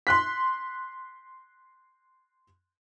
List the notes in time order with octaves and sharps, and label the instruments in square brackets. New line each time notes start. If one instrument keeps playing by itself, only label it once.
[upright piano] C6 F#6 B6